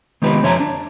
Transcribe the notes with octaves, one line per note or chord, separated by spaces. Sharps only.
D#3 G#3 B3 D#4 G4 B4
F2 D3 C#5 E5 G#5 A#5
D4